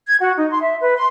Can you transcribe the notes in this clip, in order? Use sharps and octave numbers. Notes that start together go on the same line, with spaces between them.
G#6
F#4
D#4
C6
E5
B4
C6